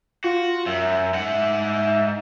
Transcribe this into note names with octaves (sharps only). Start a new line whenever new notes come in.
F4 F#4
F#2 E5
G#2 F#5